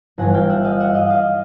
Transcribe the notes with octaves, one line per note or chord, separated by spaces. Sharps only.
G1 G2 E3 F#5 G#5
F5 G5
E5 F#5
D#5 F5
E5 F#5
D#5 F5
D#5 F5